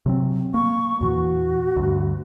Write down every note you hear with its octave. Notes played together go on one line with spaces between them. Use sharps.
C3 F#3 C4
A#3 C#6
E2 A#2 E3 F#4
D2 G2